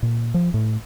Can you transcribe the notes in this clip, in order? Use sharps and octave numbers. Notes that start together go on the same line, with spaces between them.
A#2
F3
A2